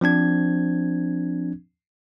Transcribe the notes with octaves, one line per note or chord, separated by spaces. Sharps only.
F3 C4 D4 G#6